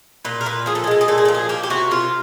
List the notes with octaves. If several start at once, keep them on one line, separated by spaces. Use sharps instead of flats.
A#2 B4
A#4
A#2 B4
F3 G#4
A4
G#4
G#3 A4
G#4
A#2 A4
G#4
F3 A4
G#4
A#3 G4
G4
C3 F#4
C3 F4